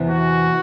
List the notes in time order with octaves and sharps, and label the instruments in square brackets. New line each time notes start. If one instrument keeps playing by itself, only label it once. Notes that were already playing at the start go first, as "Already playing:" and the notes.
Already playing: [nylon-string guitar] E2 C3 E3 B3
[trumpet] F#4